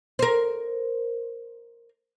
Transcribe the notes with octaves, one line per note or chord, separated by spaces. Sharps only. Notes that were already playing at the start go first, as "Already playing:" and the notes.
A#4 C5